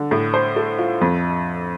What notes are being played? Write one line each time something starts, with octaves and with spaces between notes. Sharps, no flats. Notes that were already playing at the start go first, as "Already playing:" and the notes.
Already playing: D3
A2
C5
A3
F4
F2